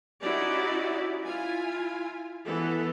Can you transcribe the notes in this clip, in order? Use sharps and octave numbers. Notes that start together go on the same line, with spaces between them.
C#4 D#4 E4 F#4 G4 D5
E4 F4 G#5
E3 B3 A4